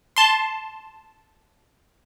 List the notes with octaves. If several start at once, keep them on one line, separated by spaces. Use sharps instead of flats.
A5 C6